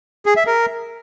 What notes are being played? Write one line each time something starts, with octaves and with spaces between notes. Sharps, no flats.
G#4
E5
A#4